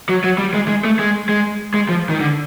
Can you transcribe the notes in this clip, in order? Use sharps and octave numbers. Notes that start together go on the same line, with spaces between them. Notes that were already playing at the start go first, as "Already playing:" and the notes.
F#3
F#3
G3
G#3
G#3
A3
G#3
G#3
G#3
F3
D#3
D3